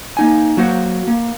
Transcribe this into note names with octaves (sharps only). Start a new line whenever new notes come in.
A#3 D#4 G#5
F#3 A#3 F#4 C5 F#5
A#3